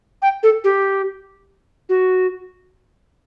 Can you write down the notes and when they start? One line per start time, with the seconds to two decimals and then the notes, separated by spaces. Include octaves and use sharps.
0.22 G5
0.43 A4
0.64 G4
1.89 F#4